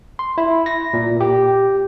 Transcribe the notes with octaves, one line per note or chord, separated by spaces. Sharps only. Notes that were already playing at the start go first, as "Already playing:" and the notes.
C6
E4
A#6
A#2
G4